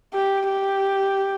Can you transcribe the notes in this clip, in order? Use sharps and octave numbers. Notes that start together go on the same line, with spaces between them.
G4
G4